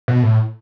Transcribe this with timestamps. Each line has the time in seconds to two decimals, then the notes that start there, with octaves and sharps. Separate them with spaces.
0.08 B2
0.23 A2